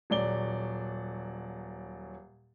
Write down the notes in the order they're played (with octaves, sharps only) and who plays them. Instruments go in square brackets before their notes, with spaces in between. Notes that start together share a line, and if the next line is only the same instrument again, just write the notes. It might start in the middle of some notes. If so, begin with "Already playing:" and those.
[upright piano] D#1 F#3 D5 G7